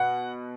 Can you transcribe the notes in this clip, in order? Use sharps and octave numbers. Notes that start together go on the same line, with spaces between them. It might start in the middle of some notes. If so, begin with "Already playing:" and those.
Already playing: B2 F#5